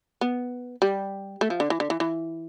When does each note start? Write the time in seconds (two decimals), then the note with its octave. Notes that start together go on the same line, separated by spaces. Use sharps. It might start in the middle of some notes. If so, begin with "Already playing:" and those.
0.21 B3
0.82 G3
1.41 A3
1.50 F3
1.60 D3
1.70 E3
1.80 D3
1.90 E3
2.00 E3